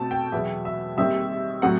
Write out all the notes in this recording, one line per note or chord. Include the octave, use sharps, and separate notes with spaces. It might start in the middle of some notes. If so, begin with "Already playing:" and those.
Already playing: B2 A3 C4 A5
G5
E2 B2 F#3 B3 E5
E5
D#2 D#3 G3 C4 E5
A2 F#3 A3 C4 F#5